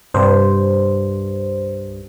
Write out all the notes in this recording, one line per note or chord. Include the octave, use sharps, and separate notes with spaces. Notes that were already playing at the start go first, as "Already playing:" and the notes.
C2 G2 C5